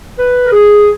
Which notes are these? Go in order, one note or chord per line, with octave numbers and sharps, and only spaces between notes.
B4
A#4
G#4